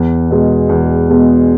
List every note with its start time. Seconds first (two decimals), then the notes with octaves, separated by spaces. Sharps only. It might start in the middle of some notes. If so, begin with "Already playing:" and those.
Already playing: E2
0.30 B2 G#3
0.69 E2
1.09 B2 G#3